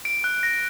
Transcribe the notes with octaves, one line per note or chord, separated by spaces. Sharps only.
D7
F#6
A#6